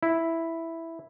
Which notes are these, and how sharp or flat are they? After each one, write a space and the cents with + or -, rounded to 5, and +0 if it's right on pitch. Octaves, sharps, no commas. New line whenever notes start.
E4 +0